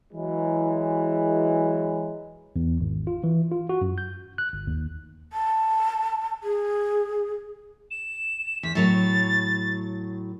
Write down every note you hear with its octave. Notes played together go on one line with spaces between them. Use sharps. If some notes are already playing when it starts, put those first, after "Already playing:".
E3 F#3 G#3
E2
G#1
F4
E3
F4
F#4
F#2
G6
F#6
G1
D#2
A5
G#4
E7
E2 B6
A2 F#3 C#5 A6